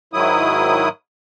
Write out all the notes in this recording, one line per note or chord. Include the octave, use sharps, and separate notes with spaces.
G#2 D#3 F#3 E4 D#6